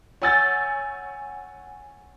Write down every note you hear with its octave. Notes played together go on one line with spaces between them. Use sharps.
C#5 F#5 G#5 E6 G6 A6